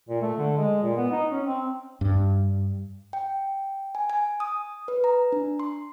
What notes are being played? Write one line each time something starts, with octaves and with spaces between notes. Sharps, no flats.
A#2
A3
D3
G#3
A#2
B3
D#4
C#4
C4
G2
G5
G#5
G#5
D#6
B4
A#5
D4
C6